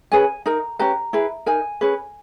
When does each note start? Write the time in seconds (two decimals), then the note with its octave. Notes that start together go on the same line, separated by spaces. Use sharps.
0.12 C#4 G#4 B4 G#5
0.46 D#4 A#4 A#5
0.79 C#4 G4 B4 A#5
1.13 E4 G#4 B4
1.46 D#4 A#4 G#5
1.81 C#4 G#4 B4